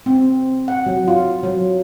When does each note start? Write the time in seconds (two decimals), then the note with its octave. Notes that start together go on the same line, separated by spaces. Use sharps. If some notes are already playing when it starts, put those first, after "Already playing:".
0.06 C4
0.68 F#5
0.86 F#3
1.08 F4
1.43 F#3